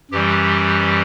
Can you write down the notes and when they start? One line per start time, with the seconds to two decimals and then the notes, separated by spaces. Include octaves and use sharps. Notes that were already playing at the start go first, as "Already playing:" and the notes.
0.11 F#2 E3 G3 G4